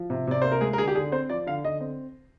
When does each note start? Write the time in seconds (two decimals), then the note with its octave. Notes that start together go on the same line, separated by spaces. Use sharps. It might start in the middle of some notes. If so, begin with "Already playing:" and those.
Already playing: F3
0.10 C3
0.27 C3 D5
0.42 A#3 C5
0.52 A#4
0.61 G#3 G#4
0.73 A#4
0.78 D3 G#4
0.88 G4
0.95 D3 G#4
1.12 C4 C5
1.29 F3 D5
1.47 D3 F5
1.65 D3 D#5
1.81 C4